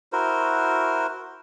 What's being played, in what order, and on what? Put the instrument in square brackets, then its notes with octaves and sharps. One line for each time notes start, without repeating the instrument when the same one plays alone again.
[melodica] E4 F#4 A#4 C5